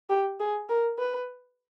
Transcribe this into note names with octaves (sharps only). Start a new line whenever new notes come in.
G4
G#4
A#4
B4